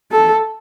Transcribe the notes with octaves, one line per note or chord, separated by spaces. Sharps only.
A4